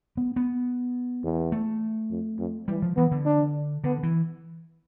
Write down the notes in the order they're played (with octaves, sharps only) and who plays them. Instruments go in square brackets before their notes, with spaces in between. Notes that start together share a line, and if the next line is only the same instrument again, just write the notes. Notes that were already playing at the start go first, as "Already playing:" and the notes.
[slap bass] B3
B3
[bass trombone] E2
[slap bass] A3
[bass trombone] F2
F2
[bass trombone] E3 [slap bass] G3
[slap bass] F3
[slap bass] E3 [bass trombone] B3
[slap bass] D3
[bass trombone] D4
[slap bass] D3 [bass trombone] B3
[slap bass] E3